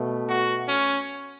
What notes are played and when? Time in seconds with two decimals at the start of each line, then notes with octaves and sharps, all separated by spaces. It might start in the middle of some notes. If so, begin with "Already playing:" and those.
Already playing: B2 A3
0.27 F#4
0.69 C#4